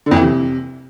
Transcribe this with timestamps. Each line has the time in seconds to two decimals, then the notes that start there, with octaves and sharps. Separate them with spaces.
0.06 D3
0.11 F2
0.16 E3
0.22 C3